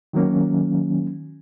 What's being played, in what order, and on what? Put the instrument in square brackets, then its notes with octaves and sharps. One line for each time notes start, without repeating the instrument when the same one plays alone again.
[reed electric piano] D#3 F#3 A#3 C#4